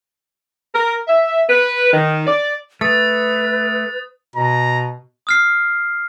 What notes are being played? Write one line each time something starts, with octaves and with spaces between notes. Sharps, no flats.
A#4
E5
B4
D#3
D5
A3 B4 D#6 A6
B2 A#5
D#6 F6 C7